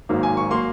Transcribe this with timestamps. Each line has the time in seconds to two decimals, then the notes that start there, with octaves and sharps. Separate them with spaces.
0.09 G#1 G#2 F#3 A#3
0.23 G#5
0.37 C#6
0.51 F#3 A#3 C6